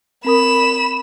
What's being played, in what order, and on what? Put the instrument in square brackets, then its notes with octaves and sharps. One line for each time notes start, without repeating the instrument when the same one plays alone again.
[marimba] C4 A#4 D#6 [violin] B5 E7